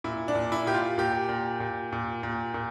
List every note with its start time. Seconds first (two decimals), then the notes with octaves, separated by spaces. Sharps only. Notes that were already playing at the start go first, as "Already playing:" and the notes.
0.04 A#2 E4
0.28 D4
0.35 A#2
0.52 E4
0.66 A#2 G4
0.74 F4
0.98 A#2 G4
1.29 A#2
1.60 A#2
1.92 A#2
2.23 A#2
2.54 A#2